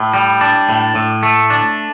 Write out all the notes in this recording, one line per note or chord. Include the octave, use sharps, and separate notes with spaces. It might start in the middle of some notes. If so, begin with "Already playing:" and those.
Already playing: A2
G3
D4
A2
A2
A3
D4